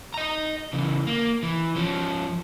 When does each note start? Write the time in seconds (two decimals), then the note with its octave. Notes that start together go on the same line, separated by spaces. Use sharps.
0.14 D#5 A#5
0.73 C#3 E3
1.07 A#3
1.43 E3
1.76 F3 C#4